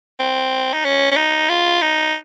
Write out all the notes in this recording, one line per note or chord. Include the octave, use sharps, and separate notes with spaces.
C4
D#4
C#4
C#4
D#4
F4
D#4